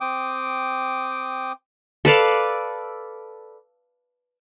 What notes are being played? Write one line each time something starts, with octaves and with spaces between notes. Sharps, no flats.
C4 G5 D6 D#6
A4 B4 D5 F5